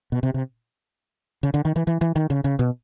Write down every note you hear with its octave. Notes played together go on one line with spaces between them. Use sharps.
B2
C3
C3
C#3
D3
D#3
E3
E3
E3
D#3
C#3
C#3
B2